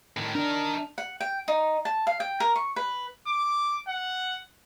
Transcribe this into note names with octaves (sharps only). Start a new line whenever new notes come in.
A2 D#3
D4 D#4 A#4
F#5
G5
D#4
A5
F5
G5
A#4
C#6
B4
D6
F#5